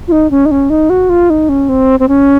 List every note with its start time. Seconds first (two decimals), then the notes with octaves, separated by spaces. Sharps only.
0.08 F4
0.12 D#4
0.31 C#4
0.46 D#4
0.51 C#4
0.70 D#4
0.90 F#4
1.10 F4
1.30 D#4
1.49 C#4
1.69 C4
2.00 C4
2.08 C#4